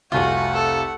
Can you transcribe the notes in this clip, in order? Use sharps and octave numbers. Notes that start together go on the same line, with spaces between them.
F1 C2 F2 A3 F4 F#4 F#5 G#5
A4